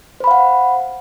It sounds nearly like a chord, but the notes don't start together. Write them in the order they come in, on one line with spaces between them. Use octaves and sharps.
C5 B5 F5 F#5